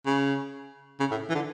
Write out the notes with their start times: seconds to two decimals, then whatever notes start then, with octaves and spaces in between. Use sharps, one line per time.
0.06 C#3
1.00 C#3
1.11 A2
1.29 E3
1.35 D3